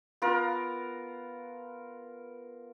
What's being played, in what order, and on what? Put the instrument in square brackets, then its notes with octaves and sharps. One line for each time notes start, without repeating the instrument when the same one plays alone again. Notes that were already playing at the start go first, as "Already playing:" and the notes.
[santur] B3 F4 A#4